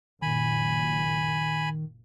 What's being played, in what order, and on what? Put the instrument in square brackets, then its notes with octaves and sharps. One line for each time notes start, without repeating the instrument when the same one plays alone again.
[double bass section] F#1 A#2 [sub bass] D#3 [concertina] G#5 B5